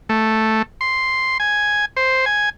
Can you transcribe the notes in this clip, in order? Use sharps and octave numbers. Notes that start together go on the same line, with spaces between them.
A3
C6
G#5
C5
G#5